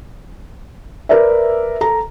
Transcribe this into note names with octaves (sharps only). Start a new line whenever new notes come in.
A#4 B4 D5 E5
A4 A#5